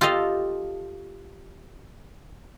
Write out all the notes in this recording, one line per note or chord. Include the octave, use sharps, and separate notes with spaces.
F4 G4 A4 D#5 F5